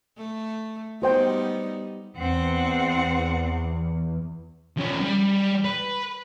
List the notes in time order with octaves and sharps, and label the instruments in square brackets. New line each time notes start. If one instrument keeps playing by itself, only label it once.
[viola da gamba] A3
[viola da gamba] G3 B3 D#4 [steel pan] F#4 C5 G5
[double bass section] E2 [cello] C4 F#5
[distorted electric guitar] F3 C#4
G3
B4